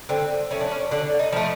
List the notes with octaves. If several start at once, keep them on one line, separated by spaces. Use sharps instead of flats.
D3 C4
F3 A3 C#4
D4
C#4
D3 D4
D#4
F3 A3